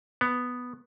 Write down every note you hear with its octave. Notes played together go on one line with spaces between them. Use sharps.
B3